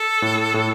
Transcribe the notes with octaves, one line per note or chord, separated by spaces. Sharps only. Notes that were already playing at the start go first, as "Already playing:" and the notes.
Already playing: A4
A2
A2